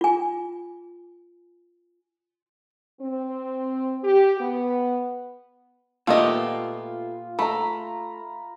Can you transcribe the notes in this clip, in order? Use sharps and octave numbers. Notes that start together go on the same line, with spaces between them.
F4 G#5
C4
G4
B3
A#2 A3 B3 F4 G4 D#5
A3 A#5 B5